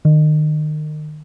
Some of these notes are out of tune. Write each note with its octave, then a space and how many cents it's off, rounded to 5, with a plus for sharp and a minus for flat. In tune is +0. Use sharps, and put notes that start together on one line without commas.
D#3 -30